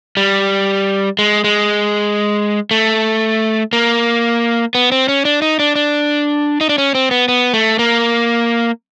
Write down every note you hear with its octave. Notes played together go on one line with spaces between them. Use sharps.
G3
G#3
G#3
A3
A#3
B3
C4
C#4
D4
D#4
D4
D4
D#4
D4
C#4
C4
B3
B3
A3
A#3